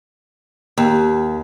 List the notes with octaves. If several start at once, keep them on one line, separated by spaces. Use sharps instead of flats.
D#2